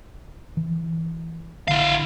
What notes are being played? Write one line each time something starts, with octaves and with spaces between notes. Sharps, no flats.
E3
A#1 D3 E4 F5